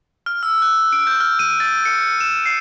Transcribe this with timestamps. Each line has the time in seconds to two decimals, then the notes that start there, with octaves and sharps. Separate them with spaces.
0.26 F6
0.43 E6
0.62 F#6
0.93 D7
1.07 G6
1.20 F6
1.39 D#7
1.60 A6
1.85 C#7
2.20 E7
2.46 C7